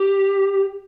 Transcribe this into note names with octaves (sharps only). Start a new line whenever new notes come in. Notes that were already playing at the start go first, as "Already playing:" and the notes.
Already playing: G4